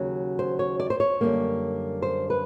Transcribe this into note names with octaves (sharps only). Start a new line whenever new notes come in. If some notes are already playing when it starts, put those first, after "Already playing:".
Already playing: D#2 C#3 F#3
C5
C#5
D5
C5
C#5
F#2 D3 G3 A#3
C5
B4